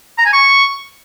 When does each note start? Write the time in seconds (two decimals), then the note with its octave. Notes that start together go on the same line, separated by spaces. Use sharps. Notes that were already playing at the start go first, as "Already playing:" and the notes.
0.18 A#5
0.26 G#5
0.33 C#6